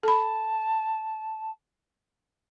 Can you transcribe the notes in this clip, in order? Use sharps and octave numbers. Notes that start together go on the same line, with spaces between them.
A4 A5 B5